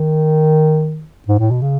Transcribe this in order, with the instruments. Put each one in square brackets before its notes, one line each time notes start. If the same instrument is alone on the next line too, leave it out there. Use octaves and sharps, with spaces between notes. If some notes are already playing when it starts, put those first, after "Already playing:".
Already playing: [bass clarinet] D#3
G#2
A2
B2
C#3